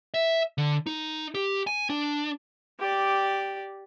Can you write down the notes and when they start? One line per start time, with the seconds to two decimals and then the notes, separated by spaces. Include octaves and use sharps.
0.14 E5
0.58 D3
0.87 D#4
1.35 G4
1.67 G#5
1.90 D4
2.80 G4 D5